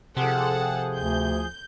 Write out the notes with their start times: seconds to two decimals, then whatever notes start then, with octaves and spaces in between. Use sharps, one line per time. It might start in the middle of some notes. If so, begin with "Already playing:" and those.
0.17 C3 F3 G#4 A4 F#5
0.97 D2 G6